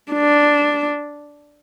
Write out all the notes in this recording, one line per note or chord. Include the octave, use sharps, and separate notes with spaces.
D4